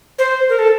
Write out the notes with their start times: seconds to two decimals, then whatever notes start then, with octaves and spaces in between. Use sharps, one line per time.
0.19 C5
0.49 A#4
0.59 A4